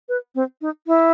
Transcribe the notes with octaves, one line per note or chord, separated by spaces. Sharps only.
B4
C4
D#4
E4